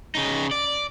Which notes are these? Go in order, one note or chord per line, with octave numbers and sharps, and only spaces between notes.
C#3 D#4
D5